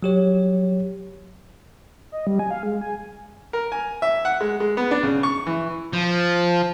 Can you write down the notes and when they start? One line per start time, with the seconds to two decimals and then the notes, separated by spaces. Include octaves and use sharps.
0.03 F#3 G4 C#5
2.12 D#5
2.27 G3
2.39 G#5
2.51 F5
2.63 G#3
2.81 G#5
3.53 A#4
3.72 G#5
4.02 E5
4.25 F#5
4.41 G#3
4.60 G#3
4.77 B3
4.91 D4
5.03 C#3
5.23 C#6
5.47 E3
5.93 F3